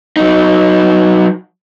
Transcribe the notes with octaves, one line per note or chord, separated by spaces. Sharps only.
F#3 D#4